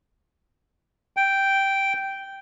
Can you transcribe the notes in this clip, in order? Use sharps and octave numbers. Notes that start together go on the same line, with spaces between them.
G5